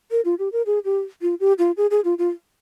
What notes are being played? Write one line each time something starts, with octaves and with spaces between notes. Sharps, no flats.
A#4
F4
G4
A#4
G#4
G4
F4
G4
F4
G#4
G#4
F4
F4